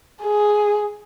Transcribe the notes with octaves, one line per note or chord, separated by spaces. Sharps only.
G#4